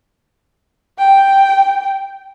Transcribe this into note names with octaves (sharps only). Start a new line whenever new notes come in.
G5